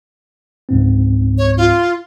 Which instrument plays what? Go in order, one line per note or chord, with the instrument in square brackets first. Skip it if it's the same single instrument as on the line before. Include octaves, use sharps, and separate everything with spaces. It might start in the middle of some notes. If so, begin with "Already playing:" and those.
[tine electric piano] C#2 G#2 C4
[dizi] C#5
F4